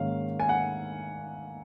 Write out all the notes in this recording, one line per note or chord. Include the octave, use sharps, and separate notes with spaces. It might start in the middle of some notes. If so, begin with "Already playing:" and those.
Already playing: G#2 D#3 A#3 C#4 F5
G#5
F#5